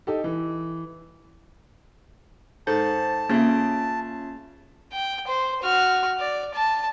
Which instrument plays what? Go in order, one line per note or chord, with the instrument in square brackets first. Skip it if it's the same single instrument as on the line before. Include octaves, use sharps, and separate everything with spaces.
[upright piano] D#4 G4 A4
E3
[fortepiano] G#2 [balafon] A4 [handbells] C5 A6 [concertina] A5
[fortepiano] C#3 [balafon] A#3 [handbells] C#4 F4 E5
[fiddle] G5
C5
F#4 F6
D5
A5